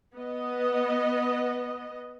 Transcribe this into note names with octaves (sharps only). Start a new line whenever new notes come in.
B3 D#5